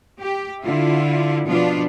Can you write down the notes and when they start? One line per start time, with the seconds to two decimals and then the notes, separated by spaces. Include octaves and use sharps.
0.20 G4
0.63 D3 E4 F4
1.47 B2 F3 B3 D4 F4